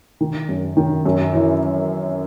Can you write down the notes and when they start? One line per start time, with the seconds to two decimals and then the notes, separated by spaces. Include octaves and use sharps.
0.21 D#3
0.49 F#2
0.77 D#3
1.06 F#2
1.33 E3